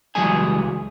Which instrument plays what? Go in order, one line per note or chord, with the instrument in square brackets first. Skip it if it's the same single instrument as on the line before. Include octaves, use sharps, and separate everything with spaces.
[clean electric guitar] C#2 E3 F#3 G3 G#4 G#5